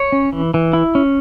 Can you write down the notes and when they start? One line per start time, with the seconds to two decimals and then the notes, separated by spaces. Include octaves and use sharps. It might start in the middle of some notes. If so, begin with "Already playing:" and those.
Already playing: C#5
0.12 C#4
0.33 E3
0.54 E3
0.73 E4
0.95 C#4